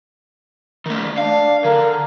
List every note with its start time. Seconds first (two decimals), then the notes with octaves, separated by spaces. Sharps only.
0.86 D#3 A3
1.18 D4 F5
1.65 D3 A#4